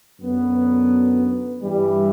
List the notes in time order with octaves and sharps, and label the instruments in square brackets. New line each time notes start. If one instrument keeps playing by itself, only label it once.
[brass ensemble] F#2 D3 F#3 B3
B4
G2 E3 G3